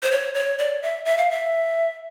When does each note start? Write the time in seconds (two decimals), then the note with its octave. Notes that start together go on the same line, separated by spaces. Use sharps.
0.03 C5
0.11 C#5
0.34 C#5
0.58 D5
0.83 E5
1.05 E5
1.18 F5
1.31 E5